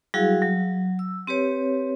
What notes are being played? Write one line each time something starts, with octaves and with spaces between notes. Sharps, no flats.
F#3 G3 E4 F#4 G#4 F5
F#3
E6
C4 G4 B4 C#5